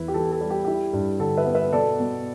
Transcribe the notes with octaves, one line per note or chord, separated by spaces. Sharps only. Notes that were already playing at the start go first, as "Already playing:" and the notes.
Already playing: E2 E4 B4
G4
E3 A4
A4
G3
G4
E4 G4
G2
D3 A4
B4 E5
B3
B4 E5
B2 A4 D5
B2